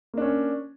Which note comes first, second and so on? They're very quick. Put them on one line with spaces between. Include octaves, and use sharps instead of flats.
A#3 D4 C#4